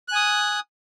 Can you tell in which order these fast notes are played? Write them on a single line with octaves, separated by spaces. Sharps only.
F#6 G#5 D#6